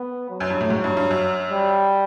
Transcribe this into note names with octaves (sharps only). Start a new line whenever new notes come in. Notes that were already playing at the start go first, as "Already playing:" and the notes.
Already playing: B3
F#3
F#2
G2
A2
G#2
G2
G2
F#2
G3